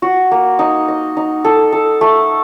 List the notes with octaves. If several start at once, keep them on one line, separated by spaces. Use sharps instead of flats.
F#4
A#3
D#4
D#5
D#4
A4
A4
A3